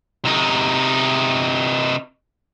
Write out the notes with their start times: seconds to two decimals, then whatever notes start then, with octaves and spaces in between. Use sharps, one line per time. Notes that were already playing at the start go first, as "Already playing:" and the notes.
0.25 C3 D#4